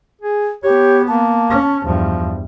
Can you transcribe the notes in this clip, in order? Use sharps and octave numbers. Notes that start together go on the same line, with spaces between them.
G#4
B3 G4 C#5
A#3 A5
C#4
E2 G2 F3